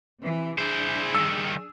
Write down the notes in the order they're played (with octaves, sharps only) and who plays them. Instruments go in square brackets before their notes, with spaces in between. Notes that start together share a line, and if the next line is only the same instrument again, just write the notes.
[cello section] C3 E3
[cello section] D4 G#4 [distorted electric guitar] E4 C5
[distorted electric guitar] G2 D#3 [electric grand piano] E6